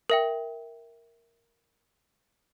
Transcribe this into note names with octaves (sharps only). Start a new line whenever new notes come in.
A#4 E5 G5